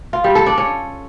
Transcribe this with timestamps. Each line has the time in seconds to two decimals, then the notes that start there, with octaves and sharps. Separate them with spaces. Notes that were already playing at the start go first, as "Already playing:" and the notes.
0.13 F4
0.24 G3
0.35 A4
0.46 D4
0.58 C#4